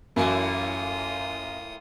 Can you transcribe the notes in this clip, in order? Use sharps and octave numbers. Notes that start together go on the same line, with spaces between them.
F#2 A2 E3 A#3 F4 D#6